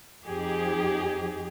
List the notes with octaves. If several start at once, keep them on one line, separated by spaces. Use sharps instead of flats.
F2 F3 D#4 G4 G#4